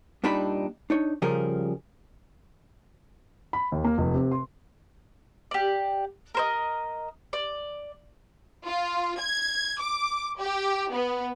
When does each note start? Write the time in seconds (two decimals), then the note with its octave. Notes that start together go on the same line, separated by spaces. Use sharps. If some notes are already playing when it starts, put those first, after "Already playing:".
0.24 G2 A#2 G3 D4 D#4 B5
0.90 D4 D#4 C#5
1.22 C#3 F3 G3 C#4 G#4 A#4
3.53 B5
3.72 D#2
3.84 A#3
3.98 F1
4.14 C3
4.31 C6
5.51 G4 D5
6.35 A#4 C5 D#5
7.33 D5
8.64 F4
9.19 G#6
9.79 D6
10.39 G4
10.91 B3